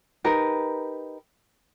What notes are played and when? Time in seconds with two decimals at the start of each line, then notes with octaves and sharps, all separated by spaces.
0.24 D#4 G4 A#4 B4